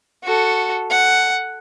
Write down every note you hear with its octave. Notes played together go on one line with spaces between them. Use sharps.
F#4 A4
F#5